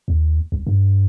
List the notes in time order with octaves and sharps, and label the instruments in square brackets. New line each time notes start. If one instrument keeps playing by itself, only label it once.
[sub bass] D#2
C2
G2